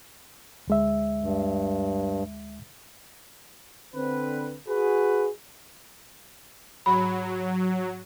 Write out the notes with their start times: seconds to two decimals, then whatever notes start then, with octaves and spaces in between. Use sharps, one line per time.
0.68 D2 G#3 E5
1.22 G2
3.95 D3 C4 B4
4.67 F#4 G#4 B4
6.86 G#2 F#3 B5